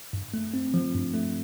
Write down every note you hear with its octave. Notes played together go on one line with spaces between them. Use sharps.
G2
A3
C4
F3
G2
A3